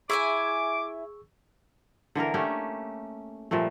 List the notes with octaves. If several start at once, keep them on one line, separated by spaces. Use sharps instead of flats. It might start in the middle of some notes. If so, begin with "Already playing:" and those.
E4 G#4 E5 G#5 C#6 D6 E6
D3 E3 A#3 A#4
A3 A#3 C#4 G4
A#2 F3 G3 A3